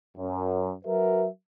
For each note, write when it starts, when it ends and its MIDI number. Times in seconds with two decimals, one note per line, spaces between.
0.16 0.71 42
0.85 1.27 54
0.85 1.27 66
0.85 1.27 70
0.85 1.27 71
0.85 1.27 76